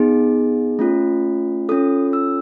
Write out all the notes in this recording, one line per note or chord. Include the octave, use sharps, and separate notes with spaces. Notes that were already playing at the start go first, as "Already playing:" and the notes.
Already playing: B3 D#4 G#4
A3 C#4 F4
C#4 F4 A4 D#6
E6